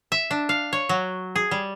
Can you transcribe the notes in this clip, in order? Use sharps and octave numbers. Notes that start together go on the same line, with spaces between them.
E5
D4
F5
C#5
F#3
G#4
G3